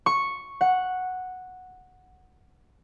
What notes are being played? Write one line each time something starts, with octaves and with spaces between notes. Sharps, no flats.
C#6
F#5